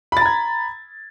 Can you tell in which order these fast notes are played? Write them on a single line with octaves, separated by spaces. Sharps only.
B5 A6 A#5 G#6